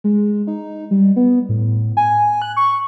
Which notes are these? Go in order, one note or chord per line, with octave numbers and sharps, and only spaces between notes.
G#3
D#4
G3
B3
A2
G#5
F#6
C#6